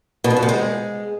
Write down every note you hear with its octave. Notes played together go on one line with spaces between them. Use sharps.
B2
G#2
F2
C3
G#3